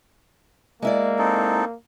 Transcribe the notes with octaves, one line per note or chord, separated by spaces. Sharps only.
G#3 A#3 E4 D5
C4 D#4 A4